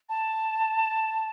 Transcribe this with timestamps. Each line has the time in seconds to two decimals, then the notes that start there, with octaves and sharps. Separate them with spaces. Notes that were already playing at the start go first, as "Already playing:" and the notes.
0.09 A5